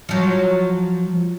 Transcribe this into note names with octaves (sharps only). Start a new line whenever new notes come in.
F3 F#3